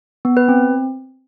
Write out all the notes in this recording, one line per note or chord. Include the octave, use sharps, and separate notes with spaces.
B3
B4
C4